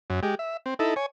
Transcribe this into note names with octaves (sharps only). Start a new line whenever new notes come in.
F#2
G#3 G4
E5
C4
D#4 E4 A4
C#5 G#5